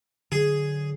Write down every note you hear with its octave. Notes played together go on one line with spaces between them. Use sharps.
D3 F#3 G#4